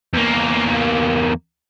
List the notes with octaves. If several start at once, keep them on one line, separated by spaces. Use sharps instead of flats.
E2 A#3